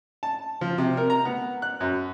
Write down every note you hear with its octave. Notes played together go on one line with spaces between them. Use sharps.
A5
F3
C3
A#4
A#5
B3
F#6
F#2